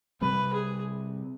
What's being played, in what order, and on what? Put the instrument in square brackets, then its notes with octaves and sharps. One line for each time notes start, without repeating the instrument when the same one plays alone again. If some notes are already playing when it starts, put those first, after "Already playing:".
[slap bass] C3 G3 C4 [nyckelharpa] B4
[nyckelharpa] G#4